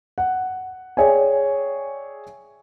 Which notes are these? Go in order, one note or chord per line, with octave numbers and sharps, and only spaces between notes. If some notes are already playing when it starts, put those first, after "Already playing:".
F#5
G#4 C#5 D5 E5 G5 G#5